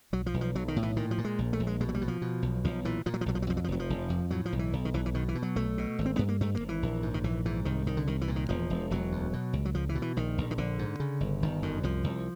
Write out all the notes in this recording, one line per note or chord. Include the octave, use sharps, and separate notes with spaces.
B1 F#3
F3
B1
F3
B1 F#3
D#3
A2
E3
A#2 D#3
F3
A#2
G#3
A#1
A3
A#1
G#3
B2 G#3
F#3
G3
B2
F3
B2
B1
B1 F3
A#2 E3
A#2 F3
F#3
F3
B1 F#3
F3
F#3
F2 F3
F#3
F3
F1 F#3
F3
F1
F2
A2 F#3
F3
B1
E3
B1
D#3
B1 E3
E3
B2 D#3
E3
B2
F#3
B1 A3
B2
G#1
C4
G2 B3
A#3
G2 A3
A#3
G#1
E3
A#1
G#2
D#3
A#1 E3
G#2 E3
C2 D#3
C2 D#3
D3
C2 D#3
E3
A#2
D#3
E1 F3
E1
E1 F#3
D2
B2
C#2
F#3
C#2 F3
E3
B2
E3
A#1 D#3
A#1
D#3
A#1 D3
G#2
C#3
G1
G1 D#3
F#2 D#3
C2 F3
C2